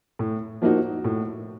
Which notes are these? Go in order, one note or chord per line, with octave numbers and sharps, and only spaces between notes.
A2
F3 A#3 D#4 F#4
A2